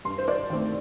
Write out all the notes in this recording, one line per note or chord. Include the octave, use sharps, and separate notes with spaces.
G2 C6
C5
D5
D#3 A3 C4